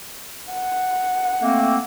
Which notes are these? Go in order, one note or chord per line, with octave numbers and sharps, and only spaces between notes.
F#5
A3 A#3 C4